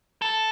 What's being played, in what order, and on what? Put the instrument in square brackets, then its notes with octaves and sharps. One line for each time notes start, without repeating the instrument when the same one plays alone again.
[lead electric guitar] A4